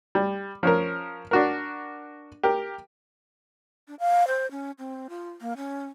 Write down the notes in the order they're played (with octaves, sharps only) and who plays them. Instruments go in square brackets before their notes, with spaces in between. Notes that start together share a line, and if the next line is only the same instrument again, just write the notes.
[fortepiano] G3
F3 C#4 A#4
D4 F#4 A#4
G4 A#4
[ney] D4
F5
C5
C#4
C4
F4
A#3
C#4